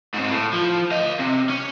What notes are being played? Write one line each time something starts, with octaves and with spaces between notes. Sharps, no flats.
G#2 C4
A2
F3
D#5 F5
C3
C#4